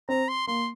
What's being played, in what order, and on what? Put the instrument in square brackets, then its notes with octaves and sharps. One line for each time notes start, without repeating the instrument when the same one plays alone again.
[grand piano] C4 [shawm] A#5
[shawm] C6
[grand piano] A#3 [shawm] C6